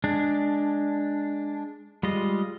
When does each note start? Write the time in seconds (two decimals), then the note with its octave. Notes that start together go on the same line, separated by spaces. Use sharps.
0.04 G#3 D4
2.03 G3 G#3 F4 D#5